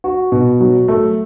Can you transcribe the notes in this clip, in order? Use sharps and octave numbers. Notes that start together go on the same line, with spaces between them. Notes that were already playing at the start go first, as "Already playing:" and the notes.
F#4
B2
F#3
A3